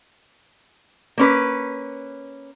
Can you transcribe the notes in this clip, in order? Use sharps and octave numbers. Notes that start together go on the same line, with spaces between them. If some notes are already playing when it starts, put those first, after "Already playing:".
A#3 C#4 B4